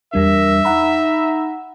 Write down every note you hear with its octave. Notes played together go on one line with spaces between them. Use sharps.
E2 G3 D4 A#4 E5
D#4 F#5 A#5 B5